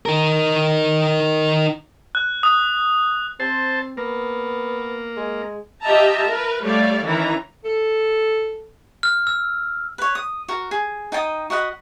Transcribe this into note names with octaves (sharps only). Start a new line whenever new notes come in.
D#4 A#4
F#6
D#6
C4 C5 A5
A#3 B3
G#3
F4 G4 D#5 E5 A5 A#5
A#4 B4
G3 A3 C#5 D5 F5
D#3 E3 C#4 E4 A#5
A4
F6
E6
B4 C#5
D#6
F#4 A#4
G#4
D#4 G5 G#5 D#6
F#4 D#5 F#5 B5